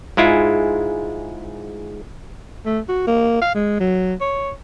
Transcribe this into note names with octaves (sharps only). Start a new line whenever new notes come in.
G#2 G#3 E4 F4
A3
F#4
A#3
F5
G#3
F#3
C#5